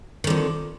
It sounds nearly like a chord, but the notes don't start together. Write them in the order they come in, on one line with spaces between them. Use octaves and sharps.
D#3 D3 F2